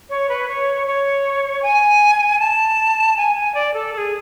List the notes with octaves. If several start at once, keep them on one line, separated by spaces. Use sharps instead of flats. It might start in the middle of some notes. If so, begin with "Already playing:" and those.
C#5
B4
C#5
C#5
G#5
A5
G#5
G#5
D5
A4
A4
G#4